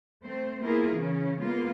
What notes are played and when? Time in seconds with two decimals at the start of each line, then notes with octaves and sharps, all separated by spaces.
0.25 A3 C4 C5
0.62 A#3 B3 E4 F4 G#4 A#4
0.94 C#3 E3 C#4
1.40 G#3 A#3 B3 F4